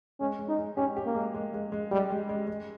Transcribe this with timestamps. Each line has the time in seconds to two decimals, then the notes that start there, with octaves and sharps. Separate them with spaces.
0.20 G#3 C#4
0.39 G#3
0.49 D#4
0.58 G#3
0.77 C#4 G4
0.97 G4
1.06 A#3
1.15 G#3
1.34 G#3
1.54 G#3
1.72 G#3
1.91 G3 G#3
2.10 G#3
2.29 G#3
2.48 G#3